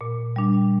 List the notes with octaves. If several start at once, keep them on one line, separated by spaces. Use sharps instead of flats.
A#2
G3 D4